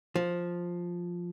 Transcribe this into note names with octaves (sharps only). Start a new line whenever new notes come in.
F3